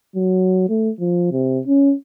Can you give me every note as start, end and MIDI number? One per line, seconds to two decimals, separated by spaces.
0.16 0.69 54
0.69 0.90 57
0.99 1.31 53
1.31 1.59 48
1.67 1.94 61